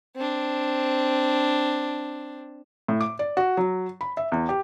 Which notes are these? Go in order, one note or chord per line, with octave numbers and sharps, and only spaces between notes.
C4 D4
A2
D6
D5
F#4
F#3
B5
E5
E2
G4